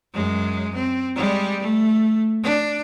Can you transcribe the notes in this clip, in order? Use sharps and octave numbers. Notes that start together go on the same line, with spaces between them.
F#2 G#3
C4
G3 G#3
A3
D4